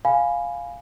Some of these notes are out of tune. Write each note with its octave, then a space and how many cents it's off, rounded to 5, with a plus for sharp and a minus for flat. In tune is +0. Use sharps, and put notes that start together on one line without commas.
F5 +5 G#5 +0 B5 +0